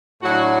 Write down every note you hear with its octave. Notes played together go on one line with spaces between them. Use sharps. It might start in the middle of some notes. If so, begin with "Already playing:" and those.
A2 F#3 D4 F#4